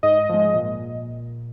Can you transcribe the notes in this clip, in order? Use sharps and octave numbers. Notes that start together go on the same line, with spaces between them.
G#2 D#5
F3 G#3
A#2